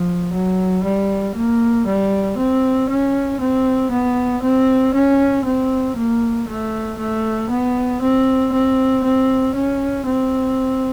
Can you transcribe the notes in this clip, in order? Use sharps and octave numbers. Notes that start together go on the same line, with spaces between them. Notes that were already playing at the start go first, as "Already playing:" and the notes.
Already playing: F3
F#3
G3
A#3
G3
C4
C#4
C4
B3
C4
C#4
C4
A#3
A3
A3
B3
C4
C4
C4
C#4
C4